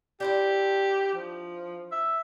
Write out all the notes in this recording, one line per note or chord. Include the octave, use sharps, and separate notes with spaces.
D4 E4 G4 C5
F3
E5